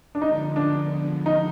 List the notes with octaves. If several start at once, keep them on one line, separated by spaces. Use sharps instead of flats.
D4
D3 F3 G#3 B3 D#4
D4
D#4